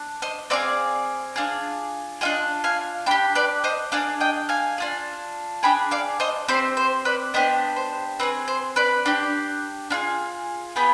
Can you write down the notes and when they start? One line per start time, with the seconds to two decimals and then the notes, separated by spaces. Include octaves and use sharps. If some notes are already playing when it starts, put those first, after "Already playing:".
Already playing: D4
0.22 C5 D#5
0.50 C4 D#4 G#4 D5 F5
1.36 D4 F4 G#4
2.21 D4 F4 G#4 D#5 G5
2.64 F5 G#5
3.06 D4 G5 B5
3.11 G4
3.35 B4 D5
3.64 C5 D#5
3.92 D4 G#4 D5 F5
4.20 D#5 G5
4.49 F5 G#5
4.78 D4 F4 G#4
5.63 D4 G#4 G5 B5
5.91 D5 F5
6.20 C5 D#5
6.48 C4 G4 C5
6.77 C5
7.05 B4 D5
7.34 B3 D4 G4 C5 D#5
7.76 C5
8.20 C4 D#4 G#4 B4
8.48 C5
8.76 B4 D5
9.06 D4 G4
9.90 D4 F4 G#4
10.76 B3 F4 G#4 G5 B5